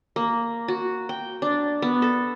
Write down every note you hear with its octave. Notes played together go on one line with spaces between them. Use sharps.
A#3
F#4
G5
D4
B3
A4